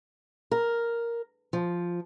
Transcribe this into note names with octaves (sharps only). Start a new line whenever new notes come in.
A#4
F3